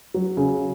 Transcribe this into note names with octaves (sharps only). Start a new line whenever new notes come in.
F#3
C#3